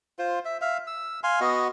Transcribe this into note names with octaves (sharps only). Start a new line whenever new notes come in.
F4 C5
E5
E5 F5
E6
F5 G#5 C6
B3 F#4 D#5